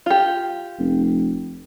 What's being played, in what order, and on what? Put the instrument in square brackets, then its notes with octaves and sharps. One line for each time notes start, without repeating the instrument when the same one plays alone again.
[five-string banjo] F4 G4
[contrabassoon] F1